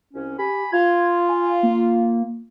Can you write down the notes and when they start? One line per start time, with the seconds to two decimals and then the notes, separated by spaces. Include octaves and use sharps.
0.14 C2 C#4
0.39 G4 G#5 B5
0.72 F4 G#6
1.29 G#5
1.63 A#3